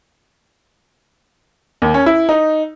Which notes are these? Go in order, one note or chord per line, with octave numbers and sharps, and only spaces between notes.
D#2
C#4
E4
D#4